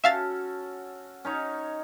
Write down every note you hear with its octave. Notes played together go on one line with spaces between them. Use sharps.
C#4 F#4 A4 E5 F5 A6
C#4 D#4 C#5